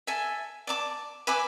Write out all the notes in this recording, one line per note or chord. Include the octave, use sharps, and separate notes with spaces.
A4 E5 G#5
D5 A5 D6
B4 E5 G#5 D6